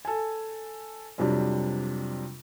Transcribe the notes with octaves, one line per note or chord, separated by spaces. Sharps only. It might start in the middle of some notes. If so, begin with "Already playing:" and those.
A4 G#5
F2 C3 F#3 G3 D4